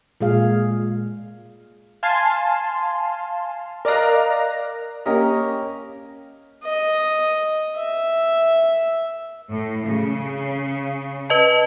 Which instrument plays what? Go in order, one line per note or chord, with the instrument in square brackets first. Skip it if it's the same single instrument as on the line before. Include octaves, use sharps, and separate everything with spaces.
[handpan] A#2 G#3 G#4 F5
[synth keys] F5 G#5 A5 C6
A#4 D5 D#5 F5 A#5 F#6
[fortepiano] A#3 C#4 G4 A#4 D#5
[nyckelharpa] D#5
E5
[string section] A2
C#3
[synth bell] B4 D#5 A5